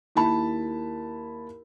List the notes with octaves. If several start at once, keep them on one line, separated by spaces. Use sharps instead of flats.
D#2 E4 A5 B5